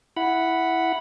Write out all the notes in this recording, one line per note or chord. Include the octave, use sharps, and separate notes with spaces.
E4 F#5 B5